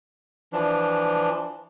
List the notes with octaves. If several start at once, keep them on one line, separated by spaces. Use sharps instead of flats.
E3 F3 D4